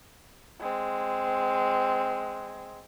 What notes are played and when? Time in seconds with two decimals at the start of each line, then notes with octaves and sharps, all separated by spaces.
0.61 G#3 C4